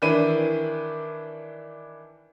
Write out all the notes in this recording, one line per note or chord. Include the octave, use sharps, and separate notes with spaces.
D#3 E3 D4 E4 D#7